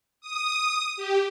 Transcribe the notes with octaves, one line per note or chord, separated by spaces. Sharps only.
D#6
G4